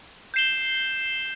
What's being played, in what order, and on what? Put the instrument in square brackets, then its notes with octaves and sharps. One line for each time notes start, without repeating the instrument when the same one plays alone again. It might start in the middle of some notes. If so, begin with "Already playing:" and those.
[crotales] G6 C7 E7 G7